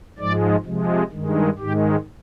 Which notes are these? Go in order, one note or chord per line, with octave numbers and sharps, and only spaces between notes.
G#2 F3 G#3 D5
C3 F3 G#3
G2 D#3 G#3
G#2 D#3 G#3 G4